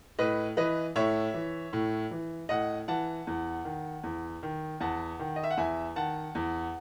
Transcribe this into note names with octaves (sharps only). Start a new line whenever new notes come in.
A2 B4 D#5
E3 B4 D#5
A2 C#5 E5
E3
A2
E3
A2 D#5 F#5
E3 F#5 A5
E2
D#3
E2
D#3
E2 F#5 A5
D#3
D#5
E5
F#5
E2 E5 G#5
D#3 F#5 A5
E2